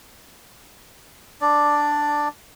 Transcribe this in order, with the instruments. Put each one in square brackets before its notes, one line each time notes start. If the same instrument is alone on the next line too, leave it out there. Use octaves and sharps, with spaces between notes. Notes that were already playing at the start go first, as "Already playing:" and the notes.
[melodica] D4 D5